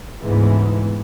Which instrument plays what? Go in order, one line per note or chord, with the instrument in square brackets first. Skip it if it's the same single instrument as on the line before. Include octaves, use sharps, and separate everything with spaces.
[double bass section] D2 G#2 C#3 E3 G#3 B3